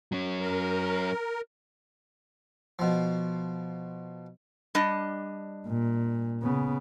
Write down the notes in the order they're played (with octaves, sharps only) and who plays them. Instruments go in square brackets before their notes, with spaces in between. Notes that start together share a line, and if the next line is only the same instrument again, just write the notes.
[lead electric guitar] F#3 C#4
[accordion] A#4
[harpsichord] B2 F3
[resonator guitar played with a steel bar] G3 D4 D#5
[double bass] A#2
C#3 B3